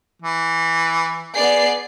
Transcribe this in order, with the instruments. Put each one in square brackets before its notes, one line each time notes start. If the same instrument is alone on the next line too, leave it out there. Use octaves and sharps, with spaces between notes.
[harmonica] E3
[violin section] B3 D5 C7 [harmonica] G#4